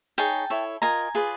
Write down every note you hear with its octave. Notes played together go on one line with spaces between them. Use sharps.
D#4 G#4 C#5 G5 A5
E4 A4 C#5
F4 A#4 D#5 G#5 A#5
F4 G#4 B4 D5